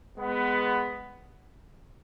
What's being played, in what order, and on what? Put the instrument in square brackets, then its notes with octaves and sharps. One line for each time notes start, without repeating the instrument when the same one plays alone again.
[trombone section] G#3 B3